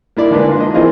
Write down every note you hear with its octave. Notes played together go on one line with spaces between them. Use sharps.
A#3 E4 D5
D3 G#3 A#3 D4 B4
A#3 D4 F4
D#5
E3 A#3 C4 F4 G#4 D#5